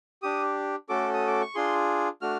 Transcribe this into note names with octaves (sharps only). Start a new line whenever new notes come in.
D4 G4 D#6
A3 C#4 F#4 A4 D6
D#6
D6
C#6
D4 F4 G#4 C6
A3 D4 F#4 F6